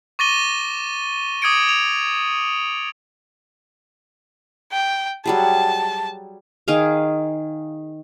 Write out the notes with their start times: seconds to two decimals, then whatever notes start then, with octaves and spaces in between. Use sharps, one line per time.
0.19 C#6 D6 A6 A#6 D#7 G7
1.42 D6 D#6 G#6 C#7 D7
1.69 F7
4.72 G5
5.26 F#3 G3 G#4 A5
6.68 D#3 G#4 F5